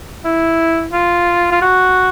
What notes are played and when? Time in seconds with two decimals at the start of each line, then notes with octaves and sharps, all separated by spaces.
0.25 E4
0.93 F4
1.51 F4
1.62 F#4